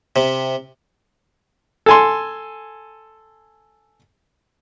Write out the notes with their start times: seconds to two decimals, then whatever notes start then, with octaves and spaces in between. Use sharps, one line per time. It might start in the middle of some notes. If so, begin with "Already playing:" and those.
0.16 C3
1.86 A4 G#5 C6